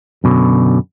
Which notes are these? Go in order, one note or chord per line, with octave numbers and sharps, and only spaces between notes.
F#2 B2 D3